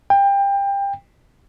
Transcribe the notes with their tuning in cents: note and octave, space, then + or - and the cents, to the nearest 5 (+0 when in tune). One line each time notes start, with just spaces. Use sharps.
G5 +25